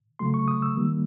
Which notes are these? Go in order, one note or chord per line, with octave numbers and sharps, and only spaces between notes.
C#3 F#3 A3 C6
C#6
D#6
E6
D#3 G3 A#3